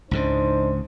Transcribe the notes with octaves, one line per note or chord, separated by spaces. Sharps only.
C#2 G#2 C#3 D4 D#4 C5